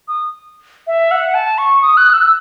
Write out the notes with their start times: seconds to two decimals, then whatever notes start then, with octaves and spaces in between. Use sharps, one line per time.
0.08 D#6
0.87 E5
1.11 F#5
1.34 A5
1.58 C#6
1.82 D#6
1.97 F#6
2.13 E6